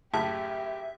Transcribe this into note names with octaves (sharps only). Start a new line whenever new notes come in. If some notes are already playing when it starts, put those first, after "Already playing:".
F#2 A2 C#3 G4 E5 A5